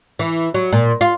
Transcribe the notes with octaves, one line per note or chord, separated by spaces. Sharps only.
E3
F#3
A#2
F4